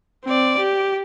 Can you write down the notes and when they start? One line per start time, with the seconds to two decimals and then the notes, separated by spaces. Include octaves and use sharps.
0.25 C4 D5
0.59 G4